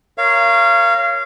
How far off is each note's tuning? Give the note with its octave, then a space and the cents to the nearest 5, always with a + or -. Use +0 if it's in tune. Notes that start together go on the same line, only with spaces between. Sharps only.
A#4 +0 C#5 +0 F5 -25